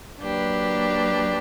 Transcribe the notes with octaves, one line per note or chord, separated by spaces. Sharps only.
F#3 A#3 D4 G4 B4